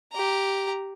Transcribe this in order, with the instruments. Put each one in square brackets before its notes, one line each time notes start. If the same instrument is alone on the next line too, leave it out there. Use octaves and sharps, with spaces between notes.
[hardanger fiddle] G4 A#5